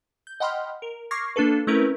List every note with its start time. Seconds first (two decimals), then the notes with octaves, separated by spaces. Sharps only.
0.27 G6
0.40 D#5 F#5 G5 B5 C6 F6
0.82 A#4
1.11 C#6 D6 F6 G#6 A#6 C7
1.36 A#3 D4 F4 A4 B4
1.67 A3 C4 C#4 E4 A#4 B4